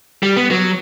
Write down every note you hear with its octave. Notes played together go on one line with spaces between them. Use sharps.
G3
B3
F#3